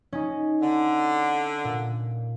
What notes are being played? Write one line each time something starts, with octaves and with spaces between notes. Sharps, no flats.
C#4 D#4
D3
A#2